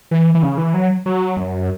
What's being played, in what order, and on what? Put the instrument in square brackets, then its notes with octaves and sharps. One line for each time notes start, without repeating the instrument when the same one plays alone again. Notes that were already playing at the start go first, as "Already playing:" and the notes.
[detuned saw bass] E3
E3
C#3
E3
F#3
F#3
F#2